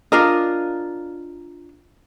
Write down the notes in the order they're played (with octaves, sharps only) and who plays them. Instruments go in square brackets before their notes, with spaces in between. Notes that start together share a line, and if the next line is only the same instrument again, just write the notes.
[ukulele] D4 F4 A#4 D#5